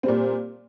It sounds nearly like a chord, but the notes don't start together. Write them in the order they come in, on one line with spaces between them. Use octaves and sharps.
C4 G3 A#2